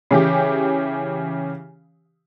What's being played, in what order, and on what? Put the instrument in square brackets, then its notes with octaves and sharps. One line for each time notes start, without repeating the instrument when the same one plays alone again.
[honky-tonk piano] C#3 E3 G4